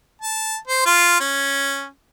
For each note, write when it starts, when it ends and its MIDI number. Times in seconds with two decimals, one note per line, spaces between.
0.21 0.57 81
0.67 0.82 72
0.86 1.19 65
1.21 1.88 61